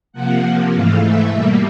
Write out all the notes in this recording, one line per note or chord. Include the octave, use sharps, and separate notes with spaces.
C3 F3 A#3 F#5
G#2 E3 A3 F5
E5
B2 G3 A#3